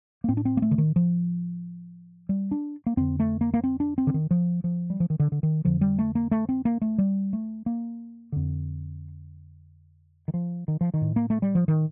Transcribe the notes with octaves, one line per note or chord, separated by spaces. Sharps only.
A#3
A2 C4
D4
C4
A#3
A3
D3
D#3
F3
G3
D4
A#3
F2 D3 C4
A3
A#3
A#3
C4
D4
C4
D3
D#3
F3
F3
G3
F3
D#3
D3
D3
D#3
F2 D3 F3
G3
A3
A#3
A3
C4
A#3
A3
G3
A3
A#3
F2 D3
D#3
F3
D#3
F3
D#3
A2
A#3
A3
G3
F3
D#3